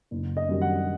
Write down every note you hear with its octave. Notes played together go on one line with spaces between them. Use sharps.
F#1
D#5
F#2 D#3 G3
F#5